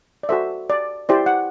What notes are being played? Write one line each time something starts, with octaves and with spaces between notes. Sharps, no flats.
D5
F#4 A4 C5 E5
D5
E4 G4 C5 D5
F#5